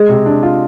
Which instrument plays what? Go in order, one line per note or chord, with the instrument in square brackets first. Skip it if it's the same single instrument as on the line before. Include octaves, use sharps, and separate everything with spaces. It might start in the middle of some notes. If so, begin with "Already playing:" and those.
Already playing: [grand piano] G#3 [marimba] G#4
[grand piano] C3
D4
F4